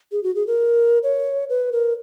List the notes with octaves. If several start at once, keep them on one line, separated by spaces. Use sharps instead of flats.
G#4
F#4
G#4
A#4
C#5
B4
A#4